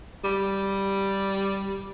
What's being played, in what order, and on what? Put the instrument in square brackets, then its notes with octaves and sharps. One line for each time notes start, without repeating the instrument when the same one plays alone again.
[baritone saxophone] G3